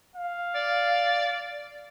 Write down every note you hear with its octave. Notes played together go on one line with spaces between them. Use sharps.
F5
D5